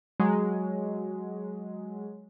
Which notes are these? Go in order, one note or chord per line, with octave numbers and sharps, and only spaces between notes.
F#3 G#3